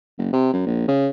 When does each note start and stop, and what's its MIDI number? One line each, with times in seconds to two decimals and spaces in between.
0.18 0.30 30
0.33 0.51 48
0.53 0.63 42
0.67 0.86 34
0.88 1.10 49